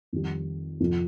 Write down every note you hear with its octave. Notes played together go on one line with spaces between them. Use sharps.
F2 D#3 G3
F2 C3 F3